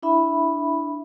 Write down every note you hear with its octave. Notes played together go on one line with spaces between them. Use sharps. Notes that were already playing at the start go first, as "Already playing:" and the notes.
D4 E4 E5 B5